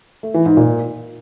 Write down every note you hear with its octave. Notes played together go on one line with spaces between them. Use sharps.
A3
E3
G#2
A#2